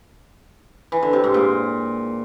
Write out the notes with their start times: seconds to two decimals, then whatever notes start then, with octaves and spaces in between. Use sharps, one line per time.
0.92 E3
1.03 D3
1.13 C3
1.24 G#2
1.34 A#2